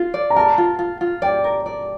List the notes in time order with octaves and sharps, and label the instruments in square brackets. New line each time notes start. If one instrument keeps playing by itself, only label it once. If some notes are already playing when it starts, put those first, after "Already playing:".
Already playing: [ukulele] F4
D5
[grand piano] A#5
[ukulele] A#4 [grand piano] A5
[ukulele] F4
F4
F4
[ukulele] D5 [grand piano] G5
[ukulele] A#4
D5